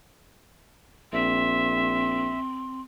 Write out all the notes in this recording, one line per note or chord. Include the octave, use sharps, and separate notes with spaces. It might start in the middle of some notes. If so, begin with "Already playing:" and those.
A#1 C4 E5 C6